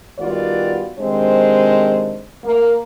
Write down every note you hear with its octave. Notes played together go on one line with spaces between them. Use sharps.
D#3 G3 B3 F4 F#4 D5
C3 D#3 G#3 C4 D4 C5
A#3